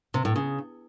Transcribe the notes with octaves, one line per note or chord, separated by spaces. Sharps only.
C3
A2
C#3